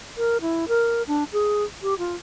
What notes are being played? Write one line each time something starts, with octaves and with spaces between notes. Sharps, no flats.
A#4
E4
A#4
D4
G#4
G4
F4